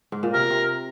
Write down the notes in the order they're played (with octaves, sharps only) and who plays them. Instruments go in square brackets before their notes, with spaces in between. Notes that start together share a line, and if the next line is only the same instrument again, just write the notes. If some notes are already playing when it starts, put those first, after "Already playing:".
[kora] G#2
A#2
[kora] C3 [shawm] A#4
[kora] C3